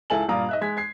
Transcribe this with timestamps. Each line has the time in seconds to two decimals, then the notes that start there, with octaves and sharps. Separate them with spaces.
0.10 C#2 E4 A4 G#5 A5 F#7
0.29 G2 A#2 D5 F5 A#5 D#6
0.49 D#5 E5 F#6
0.61 G#3 G#6 B6
0.77 G#6 C7